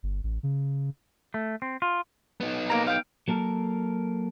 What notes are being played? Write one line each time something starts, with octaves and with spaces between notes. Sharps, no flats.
G1
A1
C#3
A3
C4
F4
B3 D#4
A#3 A#5
F5 G5
F#3 A#3 A4 A#4